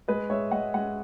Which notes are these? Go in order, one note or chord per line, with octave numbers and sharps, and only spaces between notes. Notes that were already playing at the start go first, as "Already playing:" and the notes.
G#3 B4 D#5
G#3 C#5 E5
G#3 D#5 F#5
G#3 D#5 F#5